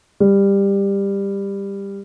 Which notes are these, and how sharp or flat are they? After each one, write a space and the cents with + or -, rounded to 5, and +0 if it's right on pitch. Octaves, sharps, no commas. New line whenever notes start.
G3 +15